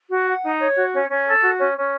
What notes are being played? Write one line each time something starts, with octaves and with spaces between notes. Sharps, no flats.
F#4
F#5
D#4
C#5
F#4
C#4
C#4
A4
F#4
C#4
C#4